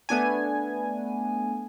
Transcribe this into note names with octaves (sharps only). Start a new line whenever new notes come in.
A3 B3 D4 G#5